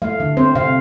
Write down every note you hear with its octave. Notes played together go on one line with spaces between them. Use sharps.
A3 F5
D3
C4 C5
C3 F5